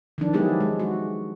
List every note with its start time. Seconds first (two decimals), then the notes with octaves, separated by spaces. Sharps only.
0.18 D#3 F3 D4
0.33 F#3 G#3 B3 E4 G4 G#4
0.60 G#3
0.79 F#4